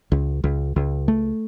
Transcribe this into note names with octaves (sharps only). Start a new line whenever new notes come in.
C#2
C#2
C#2
A3